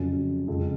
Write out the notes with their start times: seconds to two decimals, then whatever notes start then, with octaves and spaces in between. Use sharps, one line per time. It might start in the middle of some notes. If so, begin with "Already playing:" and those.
Already playing: F2 C#3 F#3 C#4
0.48 F2 C#3 G#3 C#4